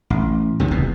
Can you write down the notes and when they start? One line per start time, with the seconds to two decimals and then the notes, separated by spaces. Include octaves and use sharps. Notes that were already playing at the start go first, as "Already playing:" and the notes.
0.10 A1
0.60 C#2 C3 D#3
0.71 F1 E2 B2